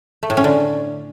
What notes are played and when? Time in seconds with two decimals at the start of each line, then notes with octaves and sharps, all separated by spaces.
0.23 A3
0.30 A2
0.37 C#4
0.44 D3